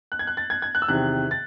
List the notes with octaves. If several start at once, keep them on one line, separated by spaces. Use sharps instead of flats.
F#6
G#6
F#6
A6
G#6
G#6
F#6
E6
E2 C3 D#3 F#6
A6